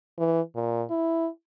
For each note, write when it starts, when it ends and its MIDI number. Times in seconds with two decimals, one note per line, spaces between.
0.18 0.41 52
0.55 0.83 46
0.90 1.28 64